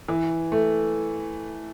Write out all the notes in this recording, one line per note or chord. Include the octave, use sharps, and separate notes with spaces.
E3
A3